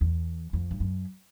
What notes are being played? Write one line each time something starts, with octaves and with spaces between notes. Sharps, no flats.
E2
F2
G2
F#2